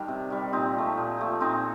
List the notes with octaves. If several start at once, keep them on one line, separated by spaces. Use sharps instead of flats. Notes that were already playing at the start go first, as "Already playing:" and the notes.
Already playing: D#3 G3 D4
C3
D#3 G3
A#2 C4 D#4
F3 A3
A#2
F3 A3
A#2 C4 D#4